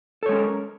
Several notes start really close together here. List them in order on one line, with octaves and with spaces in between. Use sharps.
A4 C#5 G#3 C#4 A#4